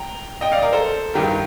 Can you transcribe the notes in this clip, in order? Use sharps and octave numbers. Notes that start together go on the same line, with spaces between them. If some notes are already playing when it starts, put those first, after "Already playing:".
Already playing: G5 A#5
D#5 G5
D5 F5
D#5
A#4 D5
A4 C5
A1 G2 D#3 G4 A#4